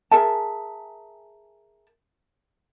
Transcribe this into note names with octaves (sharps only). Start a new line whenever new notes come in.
G#4 A#4 E5 A5